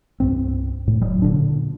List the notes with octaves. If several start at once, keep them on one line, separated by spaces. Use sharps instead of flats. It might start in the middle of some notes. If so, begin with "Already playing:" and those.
C2 G2 C4
A2
E1 F#3
A#2 D3 D4